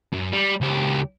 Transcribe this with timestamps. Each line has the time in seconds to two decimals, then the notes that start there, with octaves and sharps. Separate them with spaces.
0.12 F#2
0.33 G3
0.61 C#2 G4